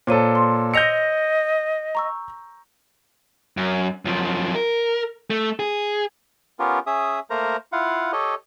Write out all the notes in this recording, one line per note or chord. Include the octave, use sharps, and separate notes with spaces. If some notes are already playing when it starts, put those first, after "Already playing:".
A#2 A4 C5 C#5 D#7
C6
D#5 E6 G6 A#6 C#7 F7
A#5 C#6 E6
F#2
F#2 F3
A#4
A3
G#4
B3 C#4 F4 G4 A#4
C#4 G#4 E5 D#6
A3 A#3 A#4 C5 A#5
E4 F4 F5 F#5
G4 A4 C#5 D#5